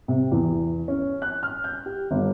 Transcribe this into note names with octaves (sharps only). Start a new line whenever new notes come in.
C3
E2
C#4
F#6
F6
G6
G4
G1